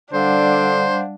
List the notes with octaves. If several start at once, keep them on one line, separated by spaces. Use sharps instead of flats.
D3 G3 D4 C5 F5 F#5